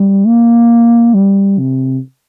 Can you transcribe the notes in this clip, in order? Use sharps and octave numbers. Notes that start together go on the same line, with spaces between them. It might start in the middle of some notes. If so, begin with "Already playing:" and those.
Already playing: G3
A#3
G3
C3